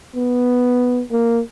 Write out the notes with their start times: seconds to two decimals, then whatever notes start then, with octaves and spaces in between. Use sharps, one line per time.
0.16 B3
1.12 A#3